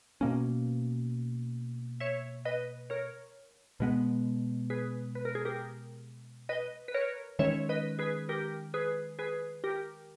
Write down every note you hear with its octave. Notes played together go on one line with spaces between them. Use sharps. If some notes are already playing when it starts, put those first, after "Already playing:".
B2 A#3 C#4
C#5 E5
B4 D#5
A#4 C#5
B2 G#3 B3
G#4 B4
B4
A#4
G#4
G4 A#4
B4 D#5
B4
A#4 C#5
D#3 G#3 C#4 C#5 E5
B4 D#5
G#4 B4
G4 A#4
G#4 B4
G#4 B4
G4 A#4